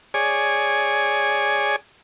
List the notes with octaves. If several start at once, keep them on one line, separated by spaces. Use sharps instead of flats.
G#4 C#5 D5 G#5